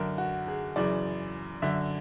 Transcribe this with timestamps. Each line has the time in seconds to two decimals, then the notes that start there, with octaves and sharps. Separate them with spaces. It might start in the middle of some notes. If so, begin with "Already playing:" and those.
Already playing: F#2 D3 A#4
0.18 F#4
0.47 G#4
0.76 F#2 C#3 E3 D5
1.62 F#2 D3 E5